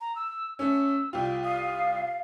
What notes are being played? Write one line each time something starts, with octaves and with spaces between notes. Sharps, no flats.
A#5
E6
A3 C#4 E6
C2 F4 G5
F5 D#6